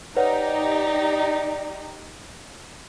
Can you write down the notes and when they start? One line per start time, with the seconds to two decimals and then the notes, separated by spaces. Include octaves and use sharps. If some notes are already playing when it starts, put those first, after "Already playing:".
0.17 D#4 G4 B4 C#5 D5 F#5